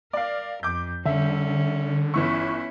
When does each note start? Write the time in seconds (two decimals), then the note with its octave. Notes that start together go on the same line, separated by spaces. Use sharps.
0.13 A#4 D5 F5
0.63 F2 D6 G6
1.06 D3 G3 C#4 E5
2.14 G1 E3 C#4 E4 C#6